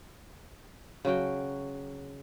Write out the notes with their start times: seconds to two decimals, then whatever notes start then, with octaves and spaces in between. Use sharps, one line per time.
1.05 C#3 F#3 F#4 G5